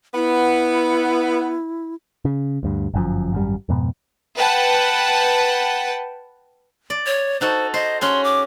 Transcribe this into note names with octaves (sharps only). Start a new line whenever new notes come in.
B3 E4
C#3
D2 G2
G1 F#2 F3
G#1 F#2 G3
F2 G#2 B2
B4 F#5 G5 A5
D5
C#5
D#4 F#4 A4 C5
C5 D#5
C#4 F#4 G#4 C6
D6